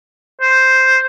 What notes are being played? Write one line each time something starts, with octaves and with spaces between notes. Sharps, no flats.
C5